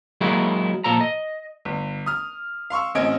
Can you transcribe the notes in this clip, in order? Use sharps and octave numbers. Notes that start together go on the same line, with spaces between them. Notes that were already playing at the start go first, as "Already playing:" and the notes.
F#3 G#3 A#3 E4 F#4 G4
A#2 F3 A4 A#5
D#5
G1
D#6 F6
F5 C6 C#6 E6
A1 C4 C#4 D#5 G#6 D7